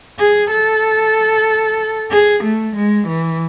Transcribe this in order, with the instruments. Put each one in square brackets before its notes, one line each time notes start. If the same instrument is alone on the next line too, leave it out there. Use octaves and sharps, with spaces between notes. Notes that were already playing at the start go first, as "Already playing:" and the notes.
[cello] G#4
A4
G#4
A3
G#3
E3